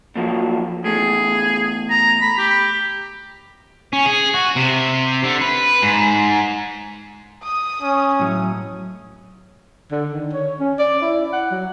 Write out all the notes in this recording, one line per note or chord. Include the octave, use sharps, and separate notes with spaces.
A#2 F3 F#3
E2 A2 G#4
A#5
B5
G4
C#4
G#4
F#4
C3
D3
B4
G#2
D#6
C#4
A2 F#3
D3
D#3
C#5
C#4
D5
E4
F#5
F#3